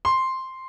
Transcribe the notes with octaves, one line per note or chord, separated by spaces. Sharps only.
C6